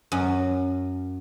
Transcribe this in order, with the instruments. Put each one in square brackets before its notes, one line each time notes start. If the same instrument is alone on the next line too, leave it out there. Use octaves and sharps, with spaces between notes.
[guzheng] F#2